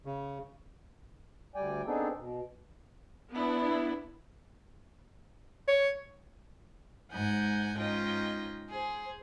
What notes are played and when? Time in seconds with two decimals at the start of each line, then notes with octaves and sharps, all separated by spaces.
0.05 C#3
1.55 D2 G3 D5 G5 G#5
1.86 B3 C4 D4 D#4 G#4 A4
2.18 B2
3.33 B3 D4 E4
5.68 C#5
7.12 G#2 F#5 G#5 G6
7.77 G#2 C#4 D#4 F4 D#5 G5
8.69 G#4 C5